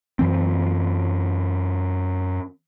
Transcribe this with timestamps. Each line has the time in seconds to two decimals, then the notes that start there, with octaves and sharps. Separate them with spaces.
0.19 F#2 E3 C4